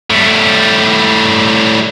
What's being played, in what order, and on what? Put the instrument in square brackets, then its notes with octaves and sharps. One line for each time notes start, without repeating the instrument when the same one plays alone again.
[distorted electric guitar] A2 G3